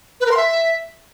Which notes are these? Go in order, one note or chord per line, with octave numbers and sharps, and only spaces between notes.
B4
A#4
C6
E5